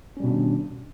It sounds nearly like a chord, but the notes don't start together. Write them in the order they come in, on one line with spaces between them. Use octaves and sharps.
C#4 G3 B2 D4 D#3